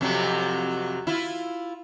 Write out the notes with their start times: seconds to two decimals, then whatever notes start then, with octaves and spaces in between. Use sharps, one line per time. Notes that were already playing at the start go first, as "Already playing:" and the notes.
0.01 F2 C3 F#3
1.07 E4 F4